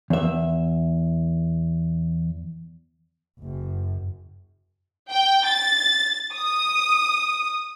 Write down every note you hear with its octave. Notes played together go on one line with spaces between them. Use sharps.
E2 E5
F#1 F#2
G5
A6
D#6